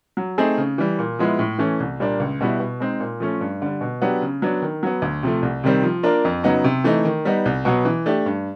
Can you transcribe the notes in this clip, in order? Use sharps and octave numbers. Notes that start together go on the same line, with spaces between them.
F#3
A3 C4 D#4 G#4
C#3
E3 G3
A#2
F3 G#3 B3 E4
A2
E3 A3 C#4
C2
A#2 G3 A#3 D4
C#2
B2 G3 B3 E4
B2
G#3 C4 D#4
A#2
F3 A3 C#4
G2
D3 G3
B2
F#3 B3 D4 G4
C#3
F#3 B3 D4
D#3
F#3 B3
D2
C3 F3 A3
C2
C3 D#3 G3 C4
F3
A#3 D4 F4 A#4
F2
C#3 F#3 B3 D#4
C3
E3 A3 C4 D#4
D#3
G3 B3 D#4
C2
B2 F#3 B3
E3
A3 D4 G4
G2